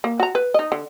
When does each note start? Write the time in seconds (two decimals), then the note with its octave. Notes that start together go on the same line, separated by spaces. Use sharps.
0.04 A#3
0.20 F#4 A#5
0.35 B4
0.54 D#4 D#5
0.72 D3